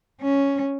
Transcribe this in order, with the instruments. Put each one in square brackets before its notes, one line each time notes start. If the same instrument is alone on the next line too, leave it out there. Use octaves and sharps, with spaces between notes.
[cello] C#4